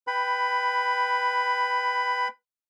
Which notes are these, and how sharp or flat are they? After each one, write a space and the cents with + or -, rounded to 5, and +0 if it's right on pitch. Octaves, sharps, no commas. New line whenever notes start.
B4 +0 G5 +0 B5 +15